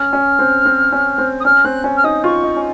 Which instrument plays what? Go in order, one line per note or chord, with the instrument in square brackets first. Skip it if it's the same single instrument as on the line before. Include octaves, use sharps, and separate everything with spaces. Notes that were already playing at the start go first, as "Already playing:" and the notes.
Already playing: [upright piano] C#4 [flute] F6
[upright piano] C#4
C4
C4
C#4
C4
[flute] D#6
[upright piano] C#4 [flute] F6
[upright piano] C4 [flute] F#6
[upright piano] C#4
[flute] F6
[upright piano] D#4 [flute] D#6
[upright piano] F4 [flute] C#6
[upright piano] D#4
C#4